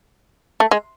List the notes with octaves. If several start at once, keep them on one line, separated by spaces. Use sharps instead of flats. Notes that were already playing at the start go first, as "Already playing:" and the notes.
A3
G#3